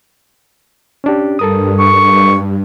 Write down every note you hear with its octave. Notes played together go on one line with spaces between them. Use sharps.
C#4 D4 G4
G2 A4 A#4 D#6
C#6